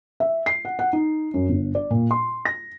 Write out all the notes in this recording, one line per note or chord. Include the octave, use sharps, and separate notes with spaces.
E5
C7
F#5
F#5
D#4
F#2
G1
D5
A#2
C6
A#6